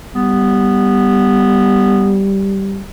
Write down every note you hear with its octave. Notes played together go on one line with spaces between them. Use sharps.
G3 B3